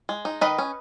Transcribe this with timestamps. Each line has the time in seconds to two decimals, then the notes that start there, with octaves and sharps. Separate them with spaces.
0.09 G#3
0.25 D#4
0.41 D#3 B4 D#5
0.58 C#4